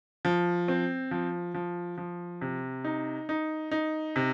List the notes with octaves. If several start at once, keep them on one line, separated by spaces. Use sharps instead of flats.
F3
C4
F3
F3
F3
C3
D#4
D#4
D#4
C3